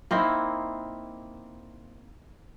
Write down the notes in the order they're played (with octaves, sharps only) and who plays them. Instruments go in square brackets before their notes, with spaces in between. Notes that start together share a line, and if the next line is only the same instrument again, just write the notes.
[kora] A#3 C4 D#4 E4